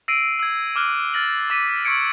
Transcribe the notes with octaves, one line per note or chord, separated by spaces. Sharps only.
E6 A#6 C7 D7 D#7
E6 G#6
D6 F6 F#6
F6 A6 A#6 F#7
D6 B6 D#7
C#6 E6 G#6 C#7 D7